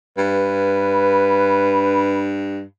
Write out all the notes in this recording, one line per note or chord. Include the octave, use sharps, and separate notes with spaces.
G2 B4